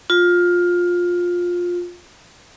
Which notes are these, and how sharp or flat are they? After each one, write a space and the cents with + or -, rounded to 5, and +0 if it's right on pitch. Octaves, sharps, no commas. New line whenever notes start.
F4 +15